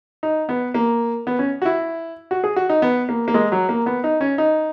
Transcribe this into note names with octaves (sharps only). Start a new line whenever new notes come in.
D#4
B3
A#3
B3
C#4
F#4
E4
F#4
G#4
F#4
D#4
B3
A#3
A#3
G#3
F#3
A#3
B3
D#4
C#4
D#4